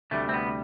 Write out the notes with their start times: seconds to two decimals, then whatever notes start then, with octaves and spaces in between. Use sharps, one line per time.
0.11 D2 C3 E3 G3 A3
0.29 C4
0.33 B3